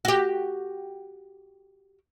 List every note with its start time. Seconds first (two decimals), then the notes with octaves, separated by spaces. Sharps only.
0.05 F#4 G4